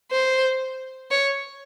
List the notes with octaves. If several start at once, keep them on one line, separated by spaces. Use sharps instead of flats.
C5
C#5